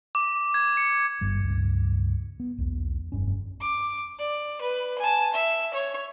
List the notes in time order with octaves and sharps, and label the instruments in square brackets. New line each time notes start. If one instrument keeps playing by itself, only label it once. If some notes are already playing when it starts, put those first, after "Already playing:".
[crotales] D6
G#6
C#7
[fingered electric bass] G#1 G2 G3
C#2 G2
B3
B1 E2
F1 G2 C#4
[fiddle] D6
D5
B4
G#5 A5
E5
C#5